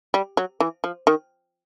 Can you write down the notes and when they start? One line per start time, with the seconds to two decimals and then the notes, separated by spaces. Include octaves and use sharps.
0.14 G3
0.37 F#3
0.60 E3
0.84 F3
1.07 D#3